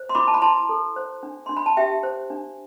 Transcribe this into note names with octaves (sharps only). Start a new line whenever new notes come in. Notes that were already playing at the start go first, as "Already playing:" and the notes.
Already playing: C5
C6
E4 B5 D6
A5
B5
E4 A5 C6
A4
C5
D4
D4 C6
B5
A5
G4 E5 G5
C5
D4